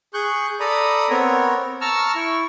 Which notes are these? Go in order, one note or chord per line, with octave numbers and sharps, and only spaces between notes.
G#4 C#6 F#6 G6
A4 D5 A#5 B5 D#6
B3 C4 A#4 C#5
A5 A#5 C#6 E6 F6
E4 C#6